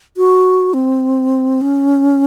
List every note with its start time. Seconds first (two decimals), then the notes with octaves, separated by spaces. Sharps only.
0.17 F#4
0.74 C4
1.61 C#4